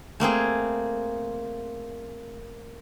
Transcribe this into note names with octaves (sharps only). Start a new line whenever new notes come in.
A3 A#3 C4 G#4